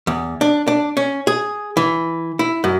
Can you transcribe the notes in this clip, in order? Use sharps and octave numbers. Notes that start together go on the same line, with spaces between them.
E2
D4
D4
C#4
G#4
E3
E4
F#2